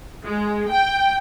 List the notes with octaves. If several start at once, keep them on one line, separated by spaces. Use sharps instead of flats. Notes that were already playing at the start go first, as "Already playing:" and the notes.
G#3
G5